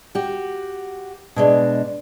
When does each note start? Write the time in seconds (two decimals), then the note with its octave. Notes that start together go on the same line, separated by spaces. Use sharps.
0.15 F#4 G4
1.36 B2 G#3 D4